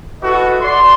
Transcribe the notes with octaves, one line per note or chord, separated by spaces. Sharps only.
E4 F#4 A4 B4 D#5
D5 C6